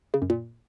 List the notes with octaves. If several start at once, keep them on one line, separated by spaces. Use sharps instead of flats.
C#3
F#2
A#2